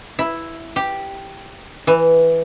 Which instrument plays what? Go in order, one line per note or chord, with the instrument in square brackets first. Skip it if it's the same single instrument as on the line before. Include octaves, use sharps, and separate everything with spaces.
[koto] E4
G4
E3